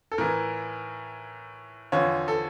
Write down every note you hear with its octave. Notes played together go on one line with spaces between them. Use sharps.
A4
A2 E3 A#4
E2 D3 F3 C#5
A4